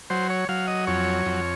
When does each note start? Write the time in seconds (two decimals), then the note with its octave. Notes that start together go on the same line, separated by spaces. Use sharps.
0.10 F#3 C5
0.30 C#5
0.49 F#3 F5
0.68 D#5
0.87 F2 C#5
1.26 F2